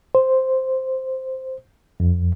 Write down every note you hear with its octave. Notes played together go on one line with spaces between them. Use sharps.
C5
F2